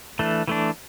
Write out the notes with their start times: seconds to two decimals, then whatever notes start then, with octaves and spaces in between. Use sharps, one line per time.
0.19 E3 A3 D4
0.47 E3 A3 D4